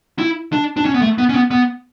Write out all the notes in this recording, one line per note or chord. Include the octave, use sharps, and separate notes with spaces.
E4
D4
D4
C#4
B3
A3
B3
C#4
B3
B3